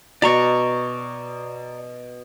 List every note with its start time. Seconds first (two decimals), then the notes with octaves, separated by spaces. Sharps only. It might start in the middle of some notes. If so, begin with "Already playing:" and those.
0.22 B2 F#4 D5 A#5 C#6